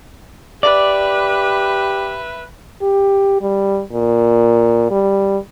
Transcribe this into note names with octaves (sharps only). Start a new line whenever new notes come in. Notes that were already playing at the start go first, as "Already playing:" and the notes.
G4 B4 D5 E5
G4
G3
A#2
G3